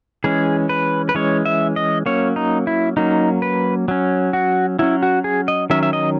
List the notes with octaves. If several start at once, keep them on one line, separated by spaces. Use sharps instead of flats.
E3 G#3 C#4 G#4
B4
B4
E3 G#3 C#4 C#5
E5
D#5
F#3 A#3 C#4 C#5
D#4
E4
F#3 A#3 C#4 D#4
B4
F#3 C#4
F#4
F#3 C#4 E4
F#4
G#4
D#5
D#3 F#3 C#4 E5
E5
D#5